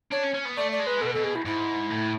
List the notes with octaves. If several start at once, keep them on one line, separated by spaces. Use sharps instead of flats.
D4 C#5
C#4
C#4
B3
A3 D5
D5
G#3
B4
B2 A4
B4
B2 A4
G#4
E4
G#2 E4
A2